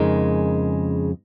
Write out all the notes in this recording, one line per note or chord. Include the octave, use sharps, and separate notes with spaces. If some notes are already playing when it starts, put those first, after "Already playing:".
Already playing: F2 C#3 G#3 D#4 A#4